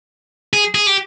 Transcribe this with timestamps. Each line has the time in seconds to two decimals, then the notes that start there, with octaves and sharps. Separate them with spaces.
0.53 G#4
0.75 G#4
0.87 G4